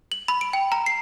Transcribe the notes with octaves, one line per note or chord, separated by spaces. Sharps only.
F#7
B5
D7
G5
A#5
C7